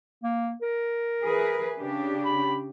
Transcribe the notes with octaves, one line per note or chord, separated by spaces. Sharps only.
A#3
A#4
E3 G#4 B4
C#3 D4 G4
B5